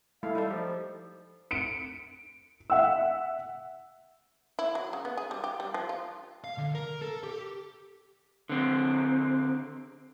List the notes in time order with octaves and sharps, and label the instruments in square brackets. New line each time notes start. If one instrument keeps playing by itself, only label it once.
[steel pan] G#3 A3 E4 [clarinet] F5
[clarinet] G3 [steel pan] D#4 A4
[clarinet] F3 [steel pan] G4
[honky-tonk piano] C#7 D7
E5 F#5 E6
[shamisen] E4
F#3
C#3
B3
G#4
G3
G4
G3
F3
F4
[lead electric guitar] F5
D3
A#4
A4
G4
[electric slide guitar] D3 C4